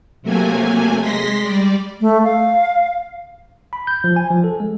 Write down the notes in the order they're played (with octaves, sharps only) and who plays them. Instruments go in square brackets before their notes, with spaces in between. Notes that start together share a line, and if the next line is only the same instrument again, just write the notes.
[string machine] C3 F#3 A3 A#3 G#5
G#3 C6 A#6 B6
G3 D5
[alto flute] A3
F5
[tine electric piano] B5
G6
F3
G#5
F3
A4
G#3